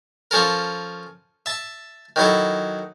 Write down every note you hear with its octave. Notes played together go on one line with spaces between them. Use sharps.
F3 C#4 A4 A#4
E5 A5
D#3 F#3 E4 A4